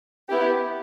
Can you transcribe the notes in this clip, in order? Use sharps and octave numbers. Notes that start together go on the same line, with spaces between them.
B3 E4 G4